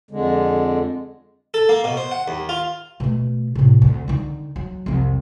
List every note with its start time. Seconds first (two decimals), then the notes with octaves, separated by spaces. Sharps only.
0.11 F2 D3 G#3
1.54 A4
1.69 A#3
1.84 B2
1.97 C5
2.12 F#5
2.28 D#2
2.49 F4
3.00 B2 A3
3.55 A2 C3
3.82 D2
4.08 D3 D#3
4.56 F#3
4.86 C2 F2